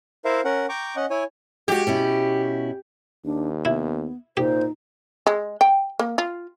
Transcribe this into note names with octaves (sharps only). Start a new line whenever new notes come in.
E4 A#4 C5 E5 F5
C#4 A#4 F#5
G5 A#5 C#6 D6
C#4 D#5 F#5
E4 C#5 G#5
G#3 F#4 G4
B2 C#4 E4
D#2 D4
B3 E4
A#2 D#4 G4 C5
G#3
G5
A#3
F4